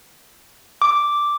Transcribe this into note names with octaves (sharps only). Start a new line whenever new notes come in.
D6